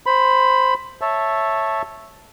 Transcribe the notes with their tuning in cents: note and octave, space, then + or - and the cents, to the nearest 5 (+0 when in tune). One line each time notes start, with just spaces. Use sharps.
C5 +0 B5 +10
C#5 -10 E5 +0 A5 +0